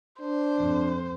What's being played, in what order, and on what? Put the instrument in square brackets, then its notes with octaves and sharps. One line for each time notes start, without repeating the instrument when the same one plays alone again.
[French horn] D4 [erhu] C5
[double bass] F2